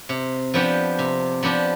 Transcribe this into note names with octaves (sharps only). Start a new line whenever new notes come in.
C3
F3 B3 D4 G4
C3
F3 B3 D4 G4